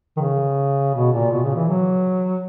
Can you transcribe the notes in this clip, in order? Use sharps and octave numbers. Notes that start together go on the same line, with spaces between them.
D#3
C#3
B2
A#2
B2
C#3
E3
F#3